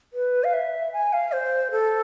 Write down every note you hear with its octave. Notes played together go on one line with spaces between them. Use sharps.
B4
F5
E5
G#5
F5
C5
A4